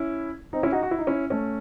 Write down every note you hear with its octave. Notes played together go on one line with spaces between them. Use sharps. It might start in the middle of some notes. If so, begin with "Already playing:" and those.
Already playing: C#4 E4
C4 D#4
C#4 E4
D#4 F#4
F#4
E4
D#4
C#4 E4
A3 C#4